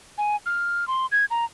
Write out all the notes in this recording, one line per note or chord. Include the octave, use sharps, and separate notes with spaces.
G#5
F6
C6
G#6
A#5